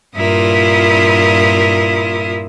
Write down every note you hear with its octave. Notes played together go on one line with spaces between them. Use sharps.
G2 A#2 E4 F4 A#4 D#6